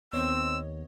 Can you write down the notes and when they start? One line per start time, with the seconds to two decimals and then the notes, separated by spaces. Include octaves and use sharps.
0.13 D#2 B3 C4 C#5 D#5 E6